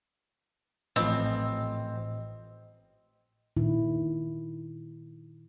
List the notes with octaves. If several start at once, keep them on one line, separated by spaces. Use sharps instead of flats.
A1 A2 F3 C4 B4 D#5
A#2 D#3 E4